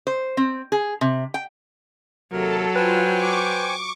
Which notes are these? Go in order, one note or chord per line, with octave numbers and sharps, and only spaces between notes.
C5
C4
G#4
C3
G5
D#2 C3 F#3 A4 A#4
F4 B4 C5 G5 G#5
C#6 D6